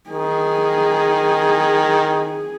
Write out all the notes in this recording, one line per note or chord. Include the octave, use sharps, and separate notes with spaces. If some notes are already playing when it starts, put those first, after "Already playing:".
D#3 G#4